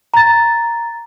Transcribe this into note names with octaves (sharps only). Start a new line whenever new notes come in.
A#5 A6